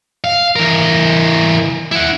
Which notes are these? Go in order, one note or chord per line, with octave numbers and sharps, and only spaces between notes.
F5
E3 A#4
E4 F#5